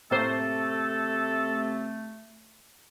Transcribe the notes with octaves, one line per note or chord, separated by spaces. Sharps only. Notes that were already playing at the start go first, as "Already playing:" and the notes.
A2 C3 A3 A#3 A4 C5